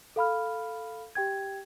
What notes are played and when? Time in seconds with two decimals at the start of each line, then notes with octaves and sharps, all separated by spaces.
0.16 A4 F5 B5 F6
1.15 G4 G5 G#6